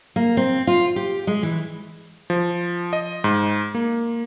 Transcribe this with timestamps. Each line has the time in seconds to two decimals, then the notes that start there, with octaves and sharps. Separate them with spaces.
0.16 A#3
0.37 C4
0.67 F4
0.96 G4
1.27 G#3
1.43 E3
2.30 F3
2.93 D#5
3.24 G#2
3.75 A#3